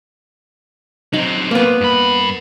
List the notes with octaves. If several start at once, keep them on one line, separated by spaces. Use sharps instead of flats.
F#3 C4 D#4
A#3 B3
G2 B5